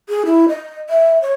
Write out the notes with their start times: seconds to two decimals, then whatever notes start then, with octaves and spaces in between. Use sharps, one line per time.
0.09 G#4
0.26 E4
0.49 D#5
0.90 E5
1.22 C#5